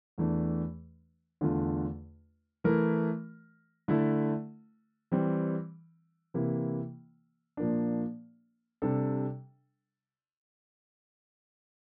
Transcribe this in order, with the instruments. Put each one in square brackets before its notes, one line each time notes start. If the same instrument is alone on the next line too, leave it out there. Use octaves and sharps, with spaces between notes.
[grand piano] E2 E3 A3 D4
E2 D3 A3 D4 F4
E3 A3 E4 A#4
D3 A3 E4 A4
E3 G3 C4
C3 E3 A#3 E4
A#2 F3 A#3 D4
C3 G3 D4 A4